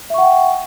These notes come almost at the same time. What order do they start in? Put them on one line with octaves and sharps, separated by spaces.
E5 C#6 F#5 G5